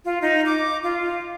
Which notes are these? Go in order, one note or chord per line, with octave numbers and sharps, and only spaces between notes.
F4
D#4
D6
F4